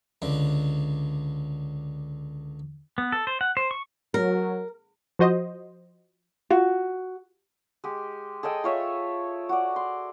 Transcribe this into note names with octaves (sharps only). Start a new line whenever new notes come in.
C#2 D3
B3
A4
C5
F#5
C5
C#6
F#3 A#4
F3 F#4 C5 D#5
F4 F#4
G#3 G4
G#4 A4 D#5 G5
F4 C#5 E5
F#4 D5
C6